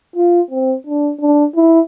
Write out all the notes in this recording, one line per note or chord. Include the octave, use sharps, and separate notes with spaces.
F4
C4
D4
D4
E4